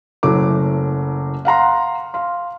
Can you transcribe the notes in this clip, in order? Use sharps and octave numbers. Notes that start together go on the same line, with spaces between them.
F#1 F#3 A3 E4 F#4 D6
F5 F#5 A#5 C6
F5 C6